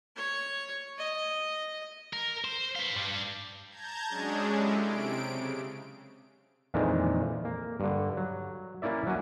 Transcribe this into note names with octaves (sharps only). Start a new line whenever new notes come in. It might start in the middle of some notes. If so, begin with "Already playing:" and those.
C#5
D#5
A#4
C5
B4 F5
G2 G3
A5 A#5 G6 G#6
F#3 G#3 C#4 D4 G#4
G#3 E4 G4 A4
C3 D7
C#3
F2 A#2 D#3 E3 G#3 D4
A#3
G2 D3
F#3
A#3 C#4 E4 D5 E5
F#3 C#4 F#4 G#5